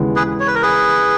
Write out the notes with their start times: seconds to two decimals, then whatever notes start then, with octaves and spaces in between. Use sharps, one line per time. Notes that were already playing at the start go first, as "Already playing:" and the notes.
Already playing: D#2 C#3 E3 G#3 B3
0.16 G#4 B4
0.40 C#5
0.47 B4
0.55 A#4
0.62 G#4 B4